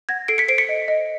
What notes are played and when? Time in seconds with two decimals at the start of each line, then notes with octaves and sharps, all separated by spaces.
0.09 F#5 G#6 A#6
0.28 A4 C7 D7
0.38 B6 C#7
0.48 C5 C7 D7
0.58 B6 C#7
0.69 D#5
0.88 D#5